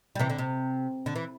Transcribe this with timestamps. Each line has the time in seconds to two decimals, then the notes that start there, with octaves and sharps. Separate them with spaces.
0.15 G3
0.19 C3 E3
0.30 D3
0.38 C3
1.06 D3
1.16 E3